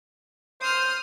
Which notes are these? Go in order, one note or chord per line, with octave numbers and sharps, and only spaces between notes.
C5 D#6 F6